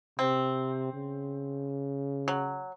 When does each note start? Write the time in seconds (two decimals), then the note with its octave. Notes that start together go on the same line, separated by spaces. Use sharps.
0.19 C3 C4
0.93 C#3
2.28 F#3